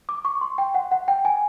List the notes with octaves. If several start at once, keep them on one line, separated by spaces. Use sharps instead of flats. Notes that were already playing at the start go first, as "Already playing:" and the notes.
D6
C#6
C6
G5
F#5
F#5
G5
G#5